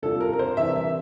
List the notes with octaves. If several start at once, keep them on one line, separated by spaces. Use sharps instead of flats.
C3 G3 D4 F4 A4
A#4
A#4
C5
C3 E3 G3 D4 E5
E5